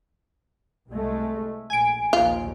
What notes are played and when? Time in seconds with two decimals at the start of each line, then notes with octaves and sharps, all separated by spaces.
0.91 C2 G#3 A3
1.70 A#1 G#5 D7
2.13 A#1 D#2 F4